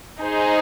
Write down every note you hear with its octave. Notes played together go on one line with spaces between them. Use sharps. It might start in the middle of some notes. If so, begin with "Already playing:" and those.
D#4 G#4 C5